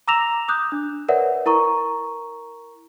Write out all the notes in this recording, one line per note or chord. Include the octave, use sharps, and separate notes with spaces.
A#5 D6 E6 A#6 E7 F7
D6 D#6 F#6 G6
D4
A#4 B4 C#5 D5 E5 F#5
E4 A#4 A#5 C#6